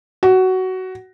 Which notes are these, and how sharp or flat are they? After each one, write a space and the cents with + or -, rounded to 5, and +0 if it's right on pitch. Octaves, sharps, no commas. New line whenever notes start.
F#4 +15